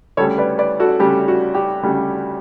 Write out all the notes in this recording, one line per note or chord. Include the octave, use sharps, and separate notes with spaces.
D2 C#3 G3 A4 C#5
B4 D5
B4 D5
F#4 A4
D2 C#3 G3 G4
F#4
G4
D2 C#3 G3